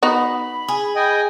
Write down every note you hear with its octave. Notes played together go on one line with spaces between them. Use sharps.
B3 D#4 F#4 B5
G#4
D#5 G5 G#5